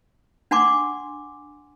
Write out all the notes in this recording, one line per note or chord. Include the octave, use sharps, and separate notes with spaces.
D4 F#5 G#5 C6 D6